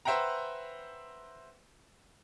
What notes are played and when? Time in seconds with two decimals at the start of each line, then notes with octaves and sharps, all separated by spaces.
0.05 B4 C5 E5 F#5 G5 A#5